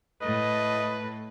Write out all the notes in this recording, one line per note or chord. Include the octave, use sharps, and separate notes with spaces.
A2 A3 B4 D#5